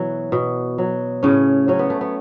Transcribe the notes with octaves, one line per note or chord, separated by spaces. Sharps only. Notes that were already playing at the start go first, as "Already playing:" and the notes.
Already playing: B2 E3 F#3 E4
B2
F#3
A2 C#3 C#4
F#3 C#4
B3
A3
B3